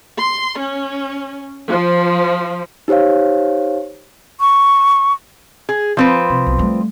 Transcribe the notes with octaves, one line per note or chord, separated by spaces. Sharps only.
C6
C#4
F3
D#4 G4 C5 C#5 F5
C#6
G#4
F3 C4 B4
C3
B1
G3 A3